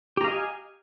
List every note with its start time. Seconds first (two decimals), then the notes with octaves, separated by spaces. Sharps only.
0.17 G4
0.21 A#5
0.24 F5
0.28 D#5
0.31 G#5